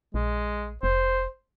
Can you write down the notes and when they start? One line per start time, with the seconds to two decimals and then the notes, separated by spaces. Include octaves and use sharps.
0.14 A#1 G#3
0.83 F1 C5